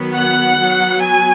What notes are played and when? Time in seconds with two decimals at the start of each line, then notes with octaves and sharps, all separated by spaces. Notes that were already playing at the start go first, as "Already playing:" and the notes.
Already playing: D#3 F#3 B3
0.16 F#5
0.58 F#3 B3
1.01 G#5